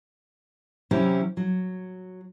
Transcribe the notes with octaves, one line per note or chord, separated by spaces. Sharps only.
C3 E3 F#3 C#4 E4 G4
F#3